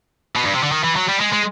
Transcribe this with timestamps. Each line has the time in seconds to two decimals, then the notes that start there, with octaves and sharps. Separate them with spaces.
0.36 B2
0.45 G2
0.54 C3
0.63 D3
0.72 D#3
0.84 E3
0.97 F#3
1.09 G3
1.21 G#3
1.33 G#3